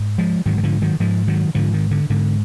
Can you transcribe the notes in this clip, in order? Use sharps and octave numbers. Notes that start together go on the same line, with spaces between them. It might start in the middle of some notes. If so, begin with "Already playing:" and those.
Already playing: G#2
F3 G#3
G#2 D#3 F#3
D#3
D3 F3
D#3 F#3
G#2 F3 G#3
D#3 F#3
G#2 D3 F3
D#3
D3
G#2 D3